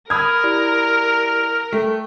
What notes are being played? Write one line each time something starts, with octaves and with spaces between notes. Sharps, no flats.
A#4 B5 D#6 F6 G#6
E4 G4 D5
A3 G5